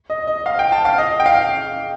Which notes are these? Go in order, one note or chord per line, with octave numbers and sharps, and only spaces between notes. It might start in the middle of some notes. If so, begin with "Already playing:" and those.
D#5
D#5
F5
G5
A5
F5
D#5
G5
F5